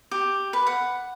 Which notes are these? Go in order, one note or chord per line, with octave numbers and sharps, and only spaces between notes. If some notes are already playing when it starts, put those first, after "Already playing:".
G4
B4
F#5